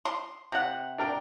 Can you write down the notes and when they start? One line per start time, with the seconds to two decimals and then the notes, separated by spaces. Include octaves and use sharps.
0.05 C6
0.52 C3 F#5
0.98 D4 A#4 G5